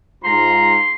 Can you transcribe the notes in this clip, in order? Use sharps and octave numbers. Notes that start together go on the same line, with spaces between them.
G#2 F4 A#5 C6